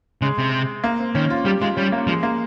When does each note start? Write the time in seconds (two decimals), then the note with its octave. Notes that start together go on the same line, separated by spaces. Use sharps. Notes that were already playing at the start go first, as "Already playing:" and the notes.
0.22 C#3 G#3
0.38 C3
0.84 A#3
0.99 C4
1.15 D#3 C#4
1.30 F4
1.45 G3 G4
1.61 G#3 F4
1.76 G3 C#4
1.92 A#3
2.07 F3 G#3
2.23 A#3